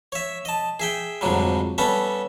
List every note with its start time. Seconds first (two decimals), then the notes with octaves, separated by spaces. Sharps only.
0.12 C#5 E5
0.45 D#5 A5
0.80 G#4 E5 G5
1.21 F2 G#2 D3 F#3 G3
1.78 G3 B3 C#4 A4 E5